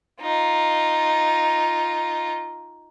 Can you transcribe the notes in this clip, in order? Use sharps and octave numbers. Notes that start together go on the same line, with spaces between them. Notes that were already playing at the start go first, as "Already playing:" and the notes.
D#4 F4